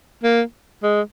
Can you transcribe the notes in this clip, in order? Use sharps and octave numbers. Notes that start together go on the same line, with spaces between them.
A#3
G#3